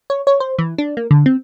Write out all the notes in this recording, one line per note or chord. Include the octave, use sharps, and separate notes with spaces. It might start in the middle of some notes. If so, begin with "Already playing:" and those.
C#5
C#5
C5
E3
D4
A#3
D3
C4